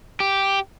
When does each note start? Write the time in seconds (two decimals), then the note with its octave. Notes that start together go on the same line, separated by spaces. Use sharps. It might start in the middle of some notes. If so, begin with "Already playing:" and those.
0.20 G4